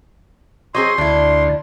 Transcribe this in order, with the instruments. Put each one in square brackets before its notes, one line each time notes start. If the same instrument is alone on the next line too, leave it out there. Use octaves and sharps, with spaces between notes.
[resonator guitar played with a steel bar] F#3 C4 G#4 [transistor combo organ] D#5 [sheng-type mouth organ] C6
[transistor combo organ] D2 [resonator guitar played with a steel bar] D4 E4